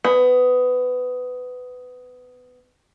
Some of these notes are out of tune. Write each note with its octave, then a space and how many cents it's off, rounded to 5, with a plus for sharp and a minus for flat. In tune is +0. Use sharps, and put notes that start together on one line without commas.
B3 +20